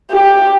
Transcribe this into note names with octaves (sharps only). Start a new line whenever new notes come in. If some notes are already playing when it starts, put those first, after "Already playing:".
G4